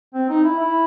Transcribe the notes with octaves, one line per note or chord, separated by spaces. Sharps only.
C4
D#4
E4
E4